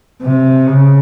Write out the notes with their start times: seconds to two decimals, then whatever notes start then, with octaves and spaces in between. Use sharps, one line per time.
0.22 C3
0.66 C#3